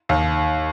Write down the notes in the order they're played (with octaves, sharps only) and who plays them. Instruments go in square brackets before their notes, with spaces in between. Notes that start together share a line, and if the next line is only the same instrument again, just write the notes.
[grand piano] D#2